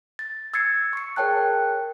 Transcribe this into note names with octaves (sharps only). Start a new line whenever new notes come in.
A6
E6 G#6 A6 C7 C#7
C#6 C#7
G#4 A#4 C#5 G5 A5 F#6